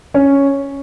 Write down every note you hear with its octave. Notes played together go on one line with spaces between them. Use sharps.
C#4 C#5